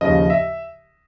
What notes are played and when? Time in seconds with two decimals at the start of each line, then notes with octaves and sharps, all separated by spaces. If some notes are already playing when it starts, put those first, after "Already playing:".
0.01 D#2 C#3 F3 D#5
0.30 E5